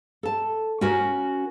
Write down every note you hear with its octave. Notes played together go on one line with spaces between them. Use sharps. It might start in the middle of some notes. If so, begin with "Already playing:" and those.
A4 A5
C#4 F#4 A#4